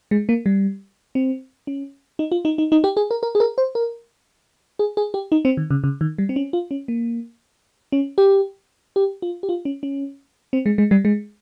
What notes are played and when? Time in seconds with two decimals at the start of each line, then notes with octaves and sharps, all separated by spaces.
0.11 G#3
0.29 A#3
0.46 G3
1.15 C4
1.67 C#4
2.19 D#4
2.32 F4
2.45 D#4
2.58 D#4
2.72 D#4
2.84 G4
2.97 G#4
3.11 A#4
3.23 A#4
3.35 G#4
3.40 A#4
3.58 C5
3.75 A#4
4.79 G#4
4.97 G#4
5.14 G4
5.32 D#4
5.45 C4
5.57 D#3
5.71 C#3
5.84 C#3
6.01 D#3
6.18 G3
6.29 C4
6.36 C#4
6.53 F4
6.71 C#4
6.88 A#3
7.92 C#4
8.18 G4
8.96 G4
9.22 F4
9.43 G4
9.49 F4
9.65 C#4
9.83 C#4
10.53 C4
10.66 G#3
10.78 G#3
10.91 G3
11.05 G#3